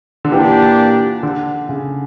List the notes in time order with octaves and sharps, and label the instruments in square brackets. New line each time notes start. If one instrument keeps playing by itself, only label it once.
[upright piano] D3
[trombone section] A#2 A#3 D4 G4 [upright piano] E3
[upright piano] D3
C#3